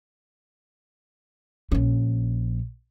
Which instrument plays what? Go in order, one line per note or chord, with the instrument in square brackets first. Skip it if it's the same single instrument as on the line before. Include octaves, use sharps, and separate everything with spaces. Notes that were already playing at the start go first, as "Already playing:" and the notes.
[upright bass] A#1 C#4